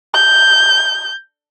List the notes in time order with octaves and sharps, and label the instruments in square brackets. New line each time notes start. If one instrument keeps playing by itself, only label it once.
[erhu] G6